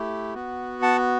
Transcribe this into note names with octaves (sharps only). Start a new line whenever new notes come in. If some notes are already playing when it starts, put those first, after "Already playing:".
Already playing: A3 E4 G4
B3 F#4
F#5 A5